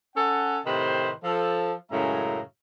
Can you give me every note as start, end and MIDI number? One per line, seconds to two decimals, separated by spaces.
0.16 0.58 61
0.16 0.58 69
0.16 0.58 78
0.66 1.10 45
0.66 1.10 48
0.66 1.10 51
0.66 1.10 71
0.66 1.10 72
1.24 1.73 53
1.24 1.73 69
1.91 2.39 42
1.91 2.39 45
1.91 2.39 49
1.91 2.39 56
1.91 2.39 76
1.91 2.39 82